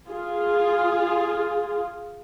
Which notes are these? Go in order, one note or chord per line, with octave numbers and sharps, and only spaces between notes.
F4 G#4